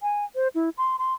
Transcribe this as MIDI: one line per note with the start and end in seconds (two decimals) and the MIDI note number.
0.02 0.25 80
0.36 0.48 72
0.55 0.70 64
0.78 0.96 84
0.99 1.14 84